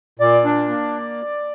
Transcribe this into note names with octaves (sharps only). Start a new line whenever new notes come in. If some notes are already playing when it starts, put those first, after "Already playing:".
A#2 D5
D4
A#3